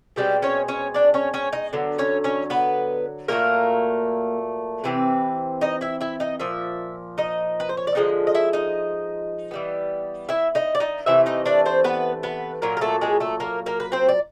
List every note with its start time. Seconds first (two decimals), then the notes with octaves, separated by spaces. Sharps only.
0.16 B2 G3 G#3 C4 G4
0.42 C#4 C#5
0.68 C#4 C#5
0.94 D4 D5
1.14 C#4 C#5
1.34 C#4 C#5
1.53 D#4 D#5
1.73 D3 F#3 B3
1.98 C#4 C#5
2.24 C#4 C#5
2.50 B3 B4
3.28 A#2 F#3 A3 A#3 A#4
4.84 C3 E3 C4 B4
5.61 D#4 D#5
5.81 E4 E5
6.01 E4 E5
6.20 D#4 D#5
6.40 A#2 F3 E5
7.18 D#4 D#5
7.60 B4
7.69 C5
7.77 C#5
7.87 D5
7.95 D3 F3 G#3 D#4 D#5
8.27 D#5
8.35 E4 E5
8.53 D#4 D#5
9.51 E3 G3 B3
10.29 E4 E5
10.55 D#4 D#5
10.75 D5
10.80 D#4 D#5
11.06 C3 E3 A3 E4 E5
11.26 D#4 D#5
11.46 D4 D5
11.66 C4 C5
11.84 B3 B4
12.23 B3 B4
12.62 A#2 F#3 A#3 A#4
12.77 A#4
12.81 A3 A4
13.01 G#3 G#4
13.20 A3 A4
13.40 A#3 A#4
13.66 A#3 A#4
13.80 B4
13.92 C4 C5
14.09 D5